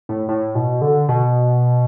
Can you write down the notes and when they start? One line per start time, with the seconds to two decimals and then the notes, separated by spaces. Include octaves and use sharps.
0.09 A2
0.29 A2
0.55 B2
0.81 D3
1.09 B2